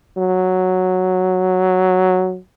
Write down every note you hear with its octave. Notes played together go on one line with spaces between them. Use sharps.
F#3